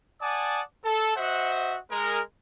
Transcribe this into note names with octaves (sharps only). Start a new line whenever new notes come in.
D5 F#5 G#5 A5 D6 D#6
A4
F#4 C5 D#5 E5 F#5
G#3 A#4